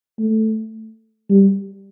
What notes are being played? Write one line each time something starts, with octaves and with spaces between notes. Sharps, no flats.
A3
G3